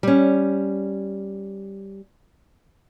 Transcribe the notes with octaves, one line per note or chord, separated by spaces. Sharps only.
G3 C#4